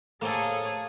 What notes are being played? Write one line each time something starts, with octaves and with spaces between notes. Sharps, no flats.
A2 C#3 F3 A#3 G#4 A4 C#5